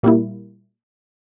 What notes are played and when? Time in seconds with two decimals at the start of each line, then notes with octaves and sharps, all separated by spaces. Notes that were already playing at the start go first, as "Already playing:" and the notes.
0.03 A#2 G3 A#3 E4